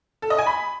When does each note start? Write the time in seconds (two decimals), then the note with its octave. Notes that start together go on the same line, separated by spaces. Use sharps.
0.22 A4
0.30 D#5
0.38 G#5
0.46 B5